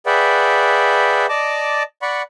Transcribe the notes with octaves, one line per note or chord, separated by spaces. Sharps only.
G#4 B4 D5 E5 F#5 G5
D5 D#5 A5 D6
D5 F#5 B5 C#6